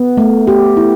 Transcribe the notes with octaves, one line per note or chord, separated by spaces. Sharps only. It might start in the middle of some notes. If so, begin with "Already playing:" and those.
Already playing: B3
A3
G4
E4